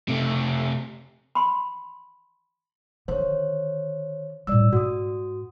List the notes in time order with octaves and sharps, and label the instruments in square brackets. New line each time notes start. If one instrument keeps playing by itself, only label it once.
[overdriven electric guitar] C3 A3
[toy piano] B5 C6
[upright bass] D3 D#3 [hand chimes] C5 C#5
[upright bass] A2 G3 [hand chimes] D5 E6
[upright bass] G#2 [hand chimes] F#4 D#6